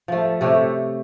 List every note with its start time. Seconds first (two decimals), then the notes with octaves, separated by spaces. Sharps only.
0.08 F3 A3
0.41 C3 A3 G4 C#5